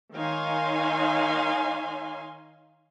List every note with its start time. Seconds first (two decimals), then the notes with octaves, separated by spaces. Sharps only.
0.15 D#3 D#4 C#5 F5 G#5 C6